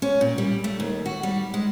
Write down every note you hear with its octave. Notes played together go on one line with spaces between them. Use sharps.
C#4
A#2
G3
A3
D#2
F#4
G3
G#3